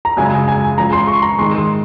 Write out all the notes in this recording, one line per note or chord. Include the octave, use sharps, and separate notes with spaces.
A#5
F#2 C#3 G#3 G#5
G#5
F#2 F3 G#3 A#5
C6
C#6
A#5
G#2 D#3 G#3 C6
C6